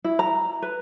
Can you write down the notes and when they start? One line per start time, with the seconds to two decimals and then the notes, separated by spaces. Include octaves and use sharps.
0.04 E4
0.19 A#5
0.62 B4